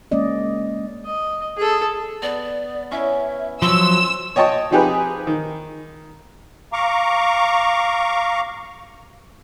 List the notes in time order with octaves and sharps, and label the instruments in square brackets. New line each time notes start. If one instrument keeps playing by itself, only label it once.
[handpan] G#3 A#3 C#4 D5 D#5
[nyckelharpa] D#5
G#4 A4
[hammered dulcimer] B3 [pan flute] D5
[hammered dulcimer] C#4 E4 [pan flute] E5
[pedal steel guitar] F3 F#3 [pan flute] C6 [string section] E6
[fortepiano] C#5 D#5 G5 A5 C#6
F3 C4 D#4 G4 G#4 B4
D#3
[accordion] F5 A#5 C#6 D6